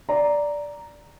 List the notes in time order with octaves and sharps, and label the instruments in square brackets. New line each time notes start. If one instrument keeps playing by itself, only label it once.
[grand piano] D5 A#5